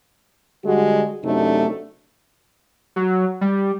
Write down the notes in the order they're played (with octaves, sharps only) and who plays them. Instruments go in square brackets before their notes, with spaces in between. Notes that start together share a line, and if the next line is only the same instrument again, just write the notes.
[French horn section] D3 G3 G#3 F#4
F#2 C3 A3 D4 D#4
[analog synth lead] F#3
G3